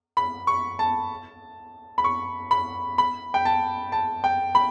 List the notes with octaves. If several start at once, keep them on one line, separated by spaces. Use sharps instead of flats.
B5
C#6
A5
B5
C#6
B5
B5
G5
A5
A5
G5
B5